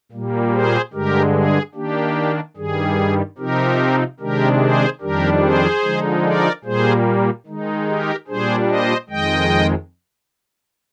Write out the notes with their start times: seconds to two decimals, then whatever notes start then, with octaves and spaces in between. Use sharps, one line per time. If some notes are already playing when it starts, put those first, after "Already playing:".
0.12 A#2 G3 A#3
0.53 G#4 C5
0.93 G2 D3 G#3 G4 A#4
1.34 G#4
1.75 D#3 A#3 D4 G4
2.57 G2 D#3 G3 G#4
3.38 C3 F3 C4 D#4 G4 A#4
4.20 C3 D#3 G#3 D4 G4 A#4
4.61 G#4 C5
5.01 F2 D#3 G3 D4 G4 A#4
5.42 G#4 C5
5.83 D3 F3 G#3 D#4
6.24 A#4 D5
6.64 A#2 G3 A#3 G#4 C5
7.46 D#3 G#3 D#4
7.87 G4 A#4
8.28 A#2 G3 D4 G#4 C5
8.68 C5 D#5
9.09 F2 D#3 G#3 D#5 G5